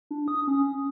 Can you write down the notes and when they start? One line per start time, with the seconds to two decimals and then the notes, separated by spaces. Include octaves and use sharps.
0.11 D4
0.28 D#6
0.48 C#4